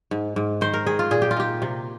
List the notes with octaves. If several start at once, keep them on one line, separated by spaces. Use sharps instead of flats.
G#2
G#2
D#3 C5
A#4
D#3 G#4
F4
A#2 G#4
G4
F4
D#4 G4
C3